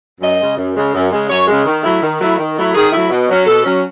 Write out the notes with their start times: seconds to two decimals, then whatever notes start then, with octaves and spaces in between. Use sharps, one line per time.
0.21 F#2 D#5
0.38 C#3 G#3
0.56 F#2
0.75 C#3 G#3
0.93 F#2
1.10 C#3 G#3
1.28 F#2 C#5
1.47 C#3 G#3
1.65 D#3
1.82 F#3 A3 E4
2.02 D#3
2.19 F#3 A3 E4
2.37 D#3
2.56 F#3 A3 E4
2.73 D#3 G#4
2.91 F#3 A3 E4
3.09 B2
3.27 F#3 C#4
3.45 B2 A4
3.64 F#3 C#4